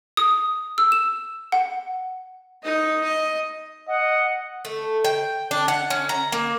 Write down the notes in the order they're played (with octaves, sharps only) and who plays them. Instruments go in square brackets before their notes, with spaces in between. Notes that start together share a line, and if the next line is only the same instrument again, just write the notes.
[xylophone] D#6
E6
E7
F#5
[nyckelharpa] D#4 D#5
D#5
[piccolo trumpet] D#5 [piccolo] F#5
[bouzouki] A3
G5
D4
F#5
C#4
A#5
A#3